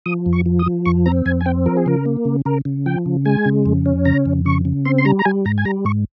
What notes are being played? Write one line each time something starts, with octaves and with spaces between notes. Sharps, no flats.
F3 D#6
F2
C#6
F3
D#6
F3
F2 C#6
C4 A#5
F2 G#5
G#5
C4 G5
F3 A#4
G#4
C#3 A#4
A#3
C#3
C#3 A#4
C#3
F3 G5
C#3
G#3 G#5
C#3
F2
C#4
C#3 A#5
F2
C#3 C#6
C#3
C4 C6
C6
G3 A#5
A#5
G3 G#5
G#2 A#5
G#5
G3 A#5
G#2 C#6